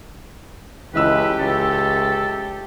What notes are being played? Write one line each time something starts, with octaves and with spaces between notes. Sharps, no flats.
C#2 E3 A3 G4 B4 D#5 E6
C#2 A4